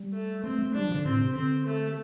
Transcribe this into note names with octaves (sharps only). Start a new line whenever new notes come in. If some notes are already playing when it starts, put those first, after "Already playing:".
Already playing: G3
A3
A3 C4
A3
G3 D4
F3
C3
D3
A2 C4
D3
C3
D3 C4
A3